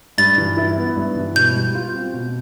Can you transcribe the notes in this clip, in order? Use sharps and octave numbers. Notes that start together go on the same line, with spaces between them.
G2 A6
E3
E4
B3
G2
E3
B2 G6
G3
F4
C4
B2